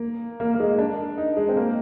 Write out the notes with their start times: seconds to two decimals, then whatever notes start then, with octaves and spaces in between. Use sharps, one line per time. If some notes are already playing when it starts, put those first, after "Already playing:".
Already playing: A#3
0.40 A#3
0.54 A#3
0.60 G#3
0.79 D4
1.18 D#4
1.37 G#3
1.49 C4
1.56 A#3